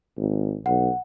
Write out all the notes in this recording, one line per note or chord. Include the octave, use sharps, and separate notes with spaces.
G#1
B1 F#5